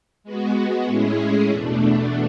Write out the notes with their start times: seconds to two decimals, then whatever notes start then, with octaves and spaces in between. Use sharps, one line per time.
0.24 G#3 B3 F#4
0.86 A2 G#3 C#4 E4 G#4
1.49 E2 B2 A3 D4